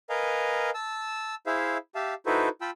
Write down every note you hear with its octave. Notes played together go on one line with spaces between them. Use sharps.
A#4 B4 D#5 F5 G#5 A#5
A5 E6
E4 G#4 C5 E5 F5
G4 E5 F5 A5
D#4 E4 F#4 A4 B4 C5
F4 G5 A5 B5 E6